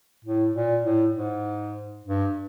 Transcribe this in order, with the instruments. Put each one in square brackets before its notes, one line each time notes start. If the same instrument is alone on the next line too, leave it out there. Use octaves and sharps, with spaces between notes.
[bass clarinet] A2
A#2
A2
G#2
G2